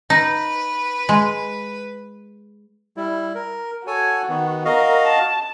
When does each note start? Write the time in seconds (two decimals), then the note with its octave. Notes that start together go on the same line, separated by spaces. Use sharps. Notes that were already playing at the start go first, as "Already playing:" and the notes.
0.10 D#4 B4
1.09 G#3
2.97 G3 E4
3.35 A#4
3.87 F#4 A4 C#5 G#5
4.29 D#3 B3
4.65 F#4 A#4 D#5 F5
5.06 A5